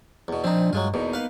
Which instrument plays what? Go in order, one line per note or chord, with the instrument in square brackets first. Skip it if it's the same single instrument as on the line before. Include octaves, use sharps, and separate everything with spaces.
[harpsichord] E2 B2
[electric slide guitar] F3 D4 D5 [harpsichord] C4 D#4
[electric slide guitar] G2 [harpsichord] F#3 G#3 F4
[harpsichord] E2 B2 [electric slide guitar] A#3 B3 D#4
[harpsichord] B4 F5